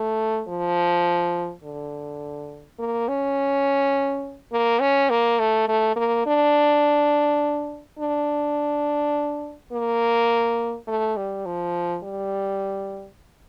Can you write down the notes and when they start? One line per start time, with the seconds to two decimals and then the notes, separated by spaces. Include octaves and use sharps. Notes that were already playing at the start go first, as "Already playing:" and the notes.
Already playing: A3
0.48 F3
1.63 D3
2.79 A#3
3.08 C#4
4.52 A#3
4.81 C#4
5.10 A#3
5.39 A3
5.68 A3
5.96 A#3
6.26 D4
7.99 D4
9.72 A#3
10.87 A3
11.17 G3
11.46 F3
12.03 G3